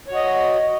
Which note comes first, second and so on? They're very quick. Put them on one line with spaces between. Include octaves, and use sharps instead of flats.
C#5 F#4 D#5